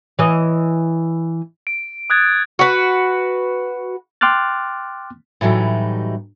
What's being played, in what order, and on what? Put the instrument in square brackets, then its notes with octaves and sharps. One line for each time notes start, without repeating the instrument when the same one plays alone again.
[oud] E3 D#5
[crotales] D7
D#6 F#6 G#6 A6
[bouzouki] F#4 B4
[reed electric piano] G5 C6 D6 F6 F#6 A6
[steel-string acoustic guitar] A2 E3 F#3 G3 D#4